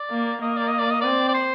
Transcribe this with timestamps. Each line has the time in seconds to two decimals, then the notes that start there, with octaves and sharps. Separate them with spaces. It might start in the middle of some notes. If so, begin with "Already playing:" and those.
Already playing: D5
0.11 A#3
0.42 A#3 D#5
0.57 D5
0.68 D#5
0.79 D5
0.90 D#5
1.01 C4 D5
1.29 D5
1.34 C5